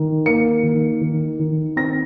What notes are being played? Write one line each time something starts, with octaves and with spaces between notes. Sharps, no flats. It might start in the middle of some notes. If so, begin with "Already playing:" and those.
Already playing: D#3
A#3 C#7
D#3
D#3
D#3
C4 A#6